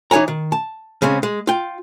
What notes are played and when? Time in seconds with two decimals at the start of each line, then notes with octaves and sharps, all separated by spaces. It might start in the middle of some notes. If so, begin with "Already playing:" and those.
0.11 E3 D#4 C#5 G#5 A#5
0.28 D#3
0.52 A5
1.02 C#3 G#3 C4 C#4
1.23 G#3
1.47 F4 G5